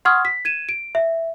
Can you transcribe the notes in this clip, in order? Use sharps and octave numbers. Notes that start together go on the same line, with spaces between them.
F#5 C6 C#6 D#6 F6 G#6
B6
G#6 D#7 E7
D7
E5